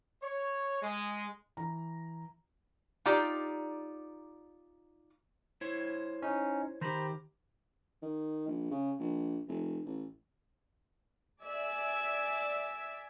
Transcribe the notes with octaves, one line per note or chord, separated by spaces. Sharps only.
C#5
G#3
E3 A#5
D#4 F4 G4 D5
E4 C5 C#5
C#4 D#4
D#3 G4 C5 A#5 B5
D#3
A#1
C#3
A#1
F1
A1
D5 E5 G#5